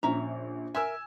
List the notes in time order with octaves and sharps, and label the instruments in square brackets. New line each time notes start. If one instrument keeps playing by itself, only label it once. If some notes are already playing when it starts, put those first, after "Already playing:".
[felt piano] A#1 [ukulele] C#4 E5 A#5
[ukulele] A#4 E5 [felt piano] G#5 E6